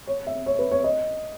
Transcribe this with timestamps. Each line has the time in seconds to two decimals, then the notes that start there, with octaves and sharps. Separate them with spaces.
0.07 C#5
0.27 E5
0.46 C#5
0.59 B4
0.71 C#5
0.84 D#5